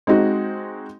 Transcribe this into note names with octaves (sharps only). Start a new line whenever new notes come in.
G#3 C4 D#4 F#4